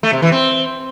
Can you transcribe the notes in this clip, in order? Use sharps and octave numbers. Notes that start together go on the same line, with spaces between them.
A3
C3
E3
C4